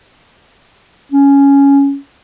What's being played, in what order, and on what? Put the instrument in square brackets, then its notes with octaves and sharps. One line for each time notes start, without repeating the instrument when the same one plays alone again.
[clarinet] C#4